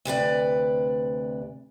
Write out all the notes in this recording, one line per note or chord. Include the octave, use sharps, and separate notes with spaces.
D2 C3 B4 D5